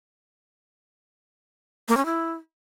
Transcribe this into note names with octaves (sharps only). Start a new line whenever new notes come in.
A#3
C#4
E4